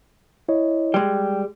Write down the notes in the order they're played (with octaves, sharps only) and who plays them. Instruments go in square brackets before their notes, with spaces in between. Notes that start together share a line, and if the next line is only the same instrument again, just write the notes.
[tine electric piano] E4 C#5 D#5
[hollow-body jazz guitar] G3 G#3 [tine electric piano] G5